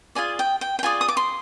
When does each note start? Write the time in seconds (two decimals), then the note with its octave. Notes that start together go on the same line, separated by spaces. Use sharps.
0.15 F4 G#4 D5 G#5
0.39 G5
0.61 G5
0.79 G5
0.83 F4 G#4 D5 G#5
1.01 D#6
1.08 D6
1.17 C6